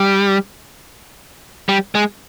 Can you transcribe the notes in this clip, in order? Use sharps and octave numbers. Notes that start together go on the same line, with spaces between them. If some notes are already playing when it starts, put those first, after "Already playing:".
Already playing: G3
G3
G#3